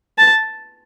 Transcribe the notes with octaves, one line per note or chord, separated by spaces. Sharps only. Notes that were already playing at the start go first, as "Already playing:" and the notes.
A5